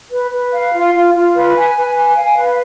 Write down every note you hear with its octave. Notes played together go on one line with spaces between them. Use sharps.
B4
B4
F5
F4
F4
F4
B4
G#5
B4
G#5
F5
B4